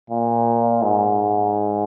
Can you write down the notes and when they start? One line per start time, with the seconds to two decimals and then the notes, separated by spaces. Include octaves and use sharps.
0.10 A#2
0.83 G#2